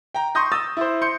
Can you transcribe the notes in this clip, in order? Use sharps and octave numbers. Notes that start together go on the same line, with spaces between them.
G5 A#5
C6 C#6 D#6 G6 A#6
D#6 E6 A6
E4 C5
C6 G6 C#7